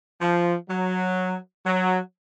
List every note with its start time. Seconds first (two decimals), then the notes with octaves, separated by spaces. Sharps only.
0.21 F3
0.69 F#3
1.66 F#3